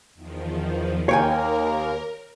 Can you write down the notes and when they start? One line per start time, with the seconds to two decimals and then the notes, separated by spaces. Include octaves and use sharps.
0.14 E2 D#3 F3
1.09 D#2 A#3 A#4 C#5 G5 G#5